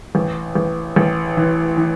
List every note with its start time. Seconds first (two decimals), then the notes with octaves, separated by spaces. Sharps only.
0.15 A1
0.55 A1
0.96 A1
1.37 E3
1.77 E3